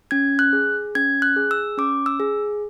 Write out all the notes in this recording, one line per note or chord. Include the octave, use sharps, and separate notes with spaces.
C#4 G#6
F#6
G#4
C#4 G#6
F#6
G#4
E6
C#4 D6
E6
G#4